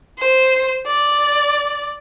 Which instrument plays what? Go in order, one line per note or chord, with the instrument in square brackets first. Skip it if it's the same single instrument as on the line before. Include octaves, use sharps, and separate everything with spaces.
[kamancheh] C5
D5